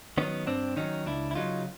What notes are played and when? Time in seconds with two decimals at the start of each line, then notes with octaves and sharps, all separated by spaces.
0.17 D#3 F#3 B3 C#4
0.47 G2 C4 D4
0.76 D#3 F#3 C#4 D#4
1.06 C#2 D4 E4
1.31 E4
1.35 C#3 F#3 D#4 F4